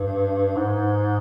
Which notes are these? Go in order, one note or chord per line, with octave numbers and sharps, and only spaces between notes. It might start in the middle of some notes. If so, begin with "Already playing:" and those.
Already playing: G2
G#2